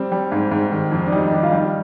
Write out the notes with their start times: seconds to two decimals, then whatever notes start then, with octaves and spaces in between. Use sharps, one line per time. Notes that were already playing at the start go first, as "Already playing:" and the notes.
Already playing: G3 C4
0.12 G3
0.32 G#2
0.51 G#2
0.72 D#3
0.92 F2
1.06 D4
1.12 G3 D#4
1.25 D#4
1.32 D#3 D4
1.43 F4
1.52 G3 D#4